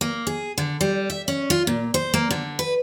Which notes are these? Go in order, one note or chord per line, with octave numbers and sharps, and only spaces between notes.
A#3
G#4
D3
G3
E5
C#4
F4
A#2
C5
A#3
D3
B4